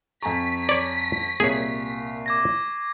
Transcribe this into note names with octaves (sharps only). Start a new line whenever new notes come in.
F2 G#5 A#5 C#6 B6
C#5 D5
C2 A#2 G#4 C#5 C7
D6 G#6 A#6